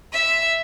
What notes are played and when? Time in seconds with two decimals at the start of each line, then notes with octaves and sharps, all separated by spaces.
0.12 E5